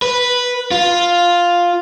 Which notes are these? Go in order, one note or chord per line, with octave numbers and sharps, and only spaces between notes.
B4
F4